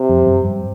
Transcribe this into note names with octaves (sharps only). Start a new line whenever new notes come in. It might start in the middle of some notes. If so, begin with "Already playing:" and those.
Already playing: C3
F2 F3
F#2 F#3
G2 G3